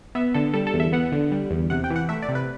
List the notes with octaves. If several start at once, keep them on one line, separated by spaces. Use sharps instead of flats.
B3 E5
D3 A4
G3 A4
A4
E2
E5
B3 F#5
D3
G3
E2
C3 F#5
G5
E3
F#5
A3 E5
D5
C3
B4